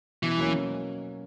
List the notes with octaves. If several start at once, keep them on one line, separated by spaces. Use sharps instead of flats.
B2 E3
F#3 A#3 C#4